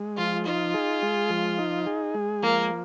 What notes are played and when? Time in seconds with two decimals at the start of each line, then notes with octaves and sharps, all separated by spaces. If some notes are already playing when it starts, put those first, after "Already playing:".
Already playing: G#3
0.17 F3 F4
0.46 D#4 F4
0.74 G#4
1.02 G#3
1.30 F3
1.58 D#4
1.86 G#4
2.14 G#3
2.43 F3 A#3